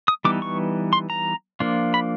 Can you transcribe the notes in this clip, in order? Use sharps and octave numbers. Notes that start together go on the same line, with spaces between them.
D#6
E3 G3 B3 D#4 D6
C#6
C6
A#5
F3 A#3 D4 F4
B5